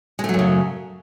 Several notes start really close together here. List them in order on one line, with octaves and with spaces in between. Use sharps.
G#3 A3 F#3 F#2 C#3